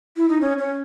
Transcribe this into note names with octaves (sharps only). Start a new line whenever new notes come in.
E4
D#4
C#4
C#4